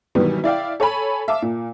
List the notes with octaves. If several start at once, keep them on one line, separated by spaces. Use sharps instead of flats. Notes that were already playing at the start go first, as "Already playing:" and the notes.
B2 D#3 E3 F#3 G3 B3
E4 D5 F5 G5
A4 C#5 G#5 B5
E5 F5 A5 D6
A#2